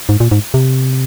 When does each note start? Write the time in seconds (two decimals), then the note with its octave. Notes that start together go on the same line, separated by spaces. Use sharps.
0.09 G#2
0.20 A#2
0.31 G#2
0.54 C3